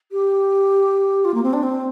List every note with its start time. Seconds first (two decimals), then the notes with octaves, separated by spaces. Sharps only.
0.12 G4
1.25 F4
1.34 A#3
1.43 C4
1.53 D4
1.63 C4